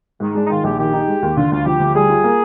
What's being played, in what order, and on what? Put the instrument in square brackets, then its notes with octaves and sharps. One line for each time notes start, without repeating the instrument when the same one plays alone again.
[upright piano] G#2 [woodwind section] D#3
[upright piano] G#3 [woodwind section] D4
[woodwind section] D#4
[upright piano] D#3 [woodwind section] F4
[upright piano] A#1 [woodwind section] G4
[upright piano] D#3 [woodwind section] G4
[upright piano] D#4
G#3
D#2
[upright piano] D3 [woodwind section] F4
[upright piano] D2 [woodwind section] F4
[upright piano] F3 [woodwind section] G4
[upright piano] D2
[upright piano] G3 [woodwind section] G#4
[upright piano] F4
A#3